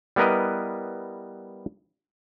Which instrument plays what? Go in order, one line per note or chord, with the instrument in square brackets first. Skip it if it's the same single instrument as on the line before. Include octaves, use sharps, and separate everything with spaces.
[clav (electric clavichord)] G3 B3 E4 A#4 B4 D#5